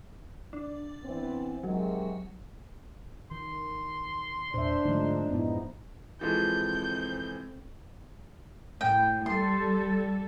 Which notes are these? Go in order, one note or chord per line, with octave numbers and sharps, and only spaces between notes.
D4
E3 B3 C4
C3 D#3 F#3 G#3
D#3 C6
E2 A#2 D4 C5 E5
G#2 D3 F3 G#3 A3 D#4
F#2 A2 B3 D#4 E4
E3 F3 G#3 C4 A4 G6
A2 G5
G3 A4 C6